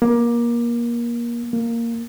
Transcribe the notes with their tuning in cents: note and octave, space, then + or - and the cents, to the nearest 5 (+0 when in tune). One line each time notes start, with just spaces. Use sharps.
A#3 +25
A#3 -5